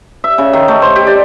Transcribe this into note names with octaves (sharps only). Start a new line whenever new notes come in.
E5
C#3
D#3
A3
C5
G4
D5